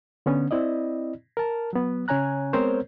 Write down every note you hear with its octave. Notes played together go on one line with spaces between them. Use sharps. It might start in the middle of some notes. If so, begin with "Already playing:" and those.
D3 B3 C#4
C4 E4 D5 D#5
A#4 A5
F#3 B3
C#3 C#4 C#5 G#5 A#5 F#6
G#3 B3 C4 A#4 C5 C#5